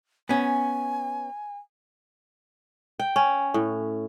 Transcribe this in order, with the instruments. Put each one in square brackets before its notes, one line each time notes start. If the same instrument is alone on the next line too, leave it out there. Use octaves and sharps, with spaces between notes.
[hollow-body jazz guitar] B3 C#4 [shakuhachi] G#5
[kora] G5
C#4
A2